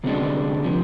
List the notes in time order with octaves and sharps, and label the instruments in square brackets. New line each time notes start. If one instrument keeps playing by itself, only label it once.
[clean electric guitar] D2 C3 G#3 D4
C3 F3